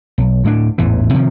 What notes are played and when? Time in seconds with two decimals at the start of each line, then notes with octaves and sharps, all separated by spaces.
0.18 B1
0.44 D2 A2 G#3 D4
0.78 A1 E2 G#2 E3
1.14 C3 D#3 F3